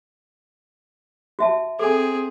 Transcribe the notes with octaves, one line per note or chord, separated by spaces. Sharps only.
F#4 E5 A5
C4 G#4 A4 G#5